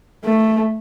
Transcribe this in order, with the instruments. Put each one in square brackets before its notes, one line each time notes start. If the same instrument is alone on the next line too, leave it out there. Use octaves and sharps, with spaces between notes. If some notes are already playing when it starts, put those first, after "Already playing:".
[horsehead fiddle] A3